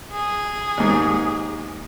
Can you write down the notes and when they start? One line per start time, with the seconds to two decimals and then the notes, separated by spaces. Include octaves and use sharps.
0.12 G#4
0.77 D#2 G#2